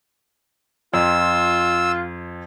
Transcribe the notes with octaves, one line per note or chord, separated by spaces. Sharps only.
F2 F4 E6